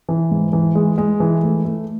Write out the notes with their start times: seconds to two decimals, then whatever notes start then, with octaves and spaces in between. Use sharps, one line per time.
0.09 E3
0.31 G#2
0.53 E3
0.75 G#3
0.98 G#3
1.20 E3
1.43 A3
1.65 A3